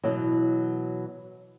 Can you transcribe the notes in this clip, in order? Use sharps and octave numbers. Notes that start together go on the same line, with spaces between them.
B2 E3 F#3